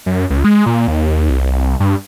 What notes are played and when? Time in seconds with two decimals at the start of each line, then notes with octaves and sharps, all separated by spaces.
0.06 F#2
0.30 C#2
0.44 G#3
0.66 A#2
0.88 D#2
1.30 C2
1.80 G2